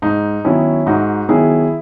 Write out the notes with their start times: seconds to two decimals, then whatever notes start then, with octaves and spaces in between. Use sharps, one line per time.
0.02 G#2 D#4
0.45 D#3 F#3 B3 C#4 E4
0.86 G#2 D#4 F#4
1.29 D#3 F#3 B3 E4 G#4